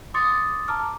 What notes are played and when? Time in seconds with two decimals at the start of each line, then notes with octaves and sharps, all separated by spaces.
0.14 C6 D6 D#6 A6 C#7
0.68 A5 A#5 D6 F6